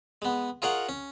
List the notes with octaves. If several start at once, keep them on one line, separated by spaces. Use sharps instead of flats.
G#3 B3
F4 G#4 A#4 C#5 D#5 F#5
C#4